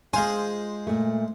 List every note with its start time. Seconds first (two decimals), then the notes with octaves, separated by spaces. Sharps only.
0.13 G#3 F4 G#4 C5
0.87 A#2 A3